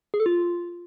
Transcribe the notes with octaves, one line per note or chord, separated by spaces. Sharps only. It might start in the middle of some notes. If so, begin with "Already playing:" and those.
G#4
A4
F4